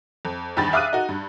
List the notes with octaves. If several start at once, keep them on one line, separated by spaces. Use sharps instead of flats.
F2
E2 G2 D#3 B5 A6
E5 F5 D6 D#6 F#6 D#7
D#4 F#4
G2